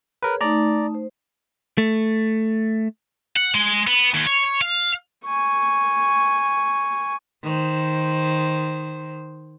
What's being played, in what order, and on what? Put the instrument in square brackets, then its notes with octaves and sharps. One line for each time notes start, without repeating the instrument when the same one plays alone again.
[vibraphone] G#4 C#5 [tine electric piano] A#4 B4
[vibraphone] A3 D#4 [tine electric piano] D5 A#5
[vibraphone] C5
[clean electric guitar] A3
[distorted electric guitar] F#5
G#3
B3
D#2
C#5
F5
[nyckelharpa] G#5 C#6
[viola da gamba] D#3 C5